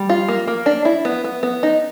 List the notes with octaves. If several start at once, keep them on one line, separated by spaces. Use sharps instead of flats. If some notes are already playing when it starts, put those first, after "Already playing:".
Already playing: G3
F4
A#3
A#3
D4
E4
B3
B3
B3
D#4